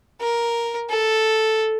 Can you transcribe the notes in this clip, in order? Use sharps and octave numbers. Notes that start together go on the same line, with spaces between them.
A#4
A4